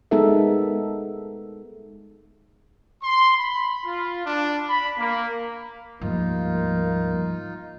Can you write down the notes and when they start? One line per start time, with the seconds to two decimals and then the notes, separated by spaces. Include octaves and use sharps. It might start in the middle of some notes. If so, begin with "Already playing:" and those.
0.11 G#3 B3 D#4 A4 A#4 E5
3.03 C6
3.37 B5
3.85 F4
4.26 D4
4.68 B5
4.98 A#3
6.01 D2 G#2 F3 G3 A#3 D#4 F4